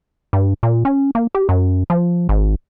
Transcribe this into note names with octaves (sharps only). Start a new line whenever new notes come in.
G2
A#2
C#4
A#3
G4
F#2
F3
G#1